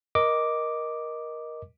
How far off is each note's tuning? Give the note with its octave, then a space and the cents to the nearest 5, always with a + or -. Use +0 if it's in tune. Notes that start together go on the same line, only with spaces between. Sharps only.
A#4 +20 D#5 +0 D6 +0